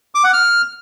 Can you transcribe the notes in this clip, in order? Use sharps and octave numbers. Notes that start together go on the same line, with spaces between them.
D6
F#5
F6